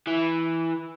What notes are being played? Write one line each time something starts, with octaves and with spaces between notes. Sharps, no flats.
E3